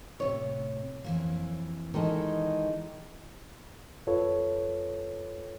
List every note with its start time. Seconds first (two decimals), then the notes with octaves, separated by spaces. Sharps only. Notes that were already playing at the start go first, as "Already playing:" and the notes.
0.20 A2 C3 C#5
1.04 F2 E3 A#3
1.94 D#3 E3 G#3 A4
4.07 F2 F4 A4 B4 C#5